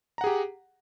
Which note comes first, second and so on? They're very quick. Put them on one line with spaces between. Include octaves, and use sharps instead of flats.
A#5 F#5 G#4 G4